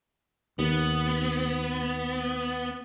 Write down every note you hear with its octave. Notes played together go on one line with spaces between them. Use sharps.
D#2 B3